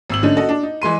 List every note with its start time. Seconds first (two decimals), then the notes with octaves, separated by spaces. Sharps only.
0.10 G#1 E6 F#7
0.23 D3 A3 C#4 D#4
0.37 F#4 A4 D#5
0.49 D4
0.63 D#4
0.82 E3 G#3 C6 D#7